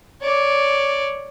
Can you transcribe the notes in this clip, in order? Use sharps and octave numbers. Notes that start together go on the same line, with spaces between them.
C#5 D5